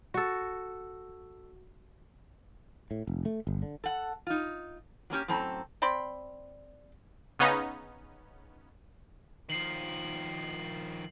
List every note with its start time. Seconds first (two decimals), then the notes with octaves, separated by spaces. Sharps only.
0.14 F#4 A4
2.91 A2
3.07 F1
3.25 A3
3.47 G1
3.62 D3
3.84 A4 F#5
4.27 D#4 F4
5.10 F#3 A#3 C#4 G4
5.28 F#2 A2 C4 A4 A#5
5.82 C4 D5 B5 C6
7.39 C#3 B3 C#4 D#4
9.50 D#3 F3 C7 F#7